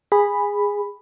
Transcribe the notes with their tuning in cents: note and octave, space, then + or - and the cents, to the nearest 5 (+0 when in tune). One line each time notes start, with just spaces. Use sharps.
G#4 -15 B5 +0